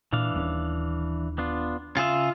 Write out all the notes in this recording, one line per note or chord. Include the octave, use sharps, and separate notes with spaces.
A#2 E3 D4 F5
D#1 D#2 C#4
B3 D4 F4
C#3 F4 G#4 E5